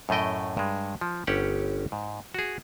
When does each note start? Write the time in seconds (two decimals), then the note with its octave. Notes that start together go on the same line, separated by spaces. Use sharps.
0.09 F#2 A2 A3 D#5 G5
0.57 G2 G#3
1.01 F3
1.27 G1 C#4 G4 F#5
1.92 G#2
2.34 F#4 G#4